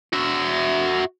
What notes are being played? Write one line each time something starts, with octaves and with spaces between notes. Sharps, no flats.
F#4 E5